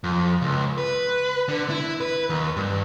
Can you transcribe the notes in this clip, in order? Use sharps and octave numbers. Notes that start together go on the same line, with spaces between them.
F2
C#2
B4
D3
E4
B4
D#2
G2